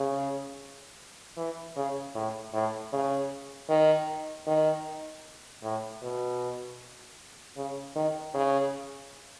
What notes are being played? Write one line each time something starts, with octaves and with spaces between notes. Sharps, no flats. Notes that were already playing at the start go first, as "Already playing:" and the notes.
Already playing: C#3
E3
C#3
A2
A2
C#3
D#3
D#3
A2
B2
C#3
D#3
C#3